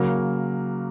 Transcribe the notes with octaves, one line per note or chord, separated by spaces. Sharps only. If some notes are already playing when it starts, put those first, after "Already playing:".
Already playing: C#3 F#3 A#3